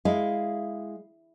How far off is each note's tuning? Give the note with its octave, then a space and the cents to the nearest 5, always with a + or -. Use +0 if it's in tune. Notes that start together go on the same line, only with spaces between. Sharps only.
G#3 +0 E4 +0 F5 +0